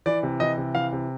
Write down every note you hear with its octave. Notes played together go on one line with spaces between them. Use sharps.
E3 D5
C3
E3 D#5
C3
E3 F5
C3